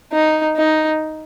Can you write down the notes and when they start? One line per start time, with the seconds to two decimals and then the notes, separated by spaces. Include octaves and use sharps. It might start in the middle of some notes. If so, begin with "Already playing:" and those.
0.13 D#4
0.57 D#4